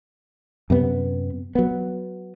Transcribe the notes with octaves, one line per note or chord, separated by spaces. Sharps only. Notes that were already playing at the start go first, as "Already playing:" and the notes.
F#2 C3 B3
F#3 B3